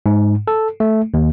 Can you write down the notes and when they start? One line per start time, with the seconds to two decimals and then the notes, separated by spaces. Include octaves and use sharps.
0.06 G#2
0.48 A4
0.80 A3
1.14 D#2